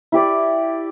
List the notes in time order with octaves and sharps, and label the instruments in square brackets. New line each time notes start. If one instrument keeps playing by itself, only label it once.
[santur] E4 G4 D5